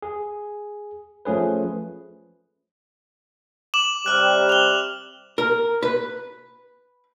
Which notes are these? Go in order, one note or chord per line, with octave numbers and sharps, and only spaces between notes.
G#4
F3 A3 C#4 G#4 B4
D6 E7 F#7
C3 G3 F6 F#6
F7 G7
A#4
B4